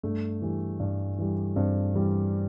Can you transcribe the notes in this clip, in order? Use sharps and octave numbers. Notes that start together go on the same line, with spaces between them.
G2 A3
E3 G3
G2
E3 G3
G2 C4
E3 G3